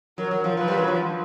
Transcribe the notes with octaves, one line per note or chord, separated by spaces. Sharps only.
F#3 A#4
F#3
F3
F3 B4
G3
F#3
F3